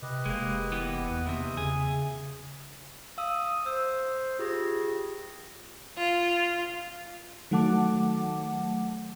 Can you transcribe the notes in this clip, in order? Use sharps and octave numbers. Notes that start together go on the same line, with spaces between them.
C3 G4 B4 D#5
F1 G#3 A#3
E3 B3
E2 B4
D#2 C3 E5 D#6
C#3 G#4
F5 D#6 E6
C5 E6
F4 G4 G#4 A#6
F4
D#3 F#3 A3 F#5 A5 D6